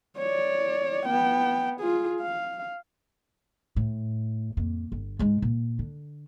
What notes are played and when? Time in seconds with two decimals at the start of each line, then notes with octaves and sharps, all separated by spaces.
0.18 C#5 D5
1.05 B3 G5
1.80 F4 G#4
2.21 F5
3.76 A2
4.57 F2 A#3
4.92 G1
5.19 G#2 G#3
5.42 A#2
5.79 D3